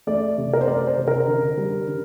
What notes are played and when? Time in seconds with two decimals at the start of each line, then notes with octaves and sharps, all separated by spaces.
0.07 A3 D5
0.38 C3
0.53 A#4
0.61 C5
0.67 A3 D5
0.87 C5
0.97 C3
1.08 A#4
1.27 D3
1.57 G3
1.87 D3